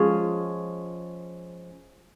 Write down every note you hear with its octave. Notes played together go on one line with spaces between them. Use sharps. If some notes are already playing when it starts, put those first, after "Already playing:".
Already playing: F3 G#3 C#4